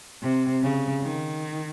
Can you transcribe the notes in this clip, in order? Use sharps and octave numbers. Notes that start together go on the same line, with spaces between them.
C3
C#3
D#3